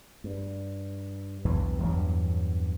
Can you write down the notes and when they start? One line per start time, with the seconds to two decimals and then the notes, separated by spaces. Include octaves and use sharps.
0.24 G2
1.45 B1 E2 G2 E3
1.83 E2 G2 E3 F#3